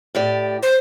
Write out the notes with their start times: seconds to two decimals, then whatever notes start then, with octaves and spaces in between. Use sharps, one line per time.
0.15 A2 G4 D5
0.63 C5